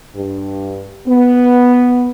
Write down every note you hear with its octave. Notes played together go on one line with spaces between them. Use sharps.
G2
B3